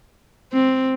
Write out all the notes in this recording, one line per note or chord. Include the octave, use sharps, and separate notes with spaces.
C4